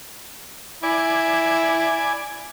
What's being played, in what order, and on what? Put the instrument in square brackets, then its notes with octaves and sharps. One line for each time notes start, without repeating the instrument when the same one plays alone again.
[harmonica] E4 [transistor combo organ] D5 G#5